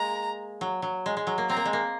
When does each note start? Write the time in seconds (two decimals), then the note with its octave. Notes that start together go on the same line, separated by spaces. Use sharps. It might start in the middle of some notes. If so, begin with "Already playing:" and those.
Already playing: G#3 A#3 A#5
0.61 F#3
0.82 F#3
1.06 G#3
1.17 G#3
1.27 F#3
1.38 A#3
1.49 C4 A#5
1.57 A#3
1.65 G#3
1.73 A#3